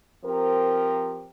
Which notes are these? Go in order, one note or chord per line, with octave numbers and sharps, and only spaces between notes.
F3 C4 G4 A#4